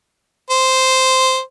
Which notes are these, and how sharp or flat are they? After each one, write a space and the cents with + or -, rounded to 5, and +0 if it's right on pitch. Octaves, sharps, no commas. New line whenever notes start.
C5 -5